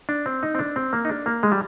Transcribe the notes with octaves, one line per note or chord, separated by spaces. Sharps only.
D4
C4
D#4
C4
D4
C4
A#3
D#4
D4
A#3
G#3
G3